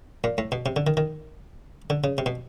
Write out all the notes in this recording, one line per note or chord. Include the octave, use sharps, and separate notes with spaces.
A#2
A2
B2
C3
D3
D#3
D#3
D3
C#3
C3
B2